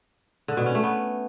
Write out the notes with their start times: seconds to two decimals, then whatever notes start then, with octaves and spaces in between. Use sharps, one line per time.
0.48 D3
0.57 B2
0.66 C#4
0.75 A3
0.84 B3